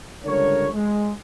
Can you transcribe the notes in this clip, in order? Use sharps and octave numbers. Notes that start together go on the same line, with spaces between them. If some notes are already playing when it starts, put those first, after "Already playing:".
C#2 D3 G3 A#4 C#5
G#3